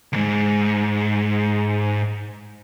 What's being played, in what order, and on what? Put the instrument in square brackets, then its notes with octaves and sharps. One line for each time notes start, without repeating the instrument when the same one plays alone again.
[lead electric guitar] D2 G#2